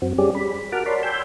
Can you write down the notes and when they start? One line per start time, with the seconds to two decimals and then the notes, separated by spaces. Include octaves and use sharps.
0.02 F#2 C4 F#4
0.18 G3 C#4 G4 G#4 D5
0.35 B5
0.72 F#4 A#4 F#5 A5 D6 F6
0.86 A#4 C#5 D5 A5 B5 C6
1.03 G5 G#5 B5 C6 E6 G6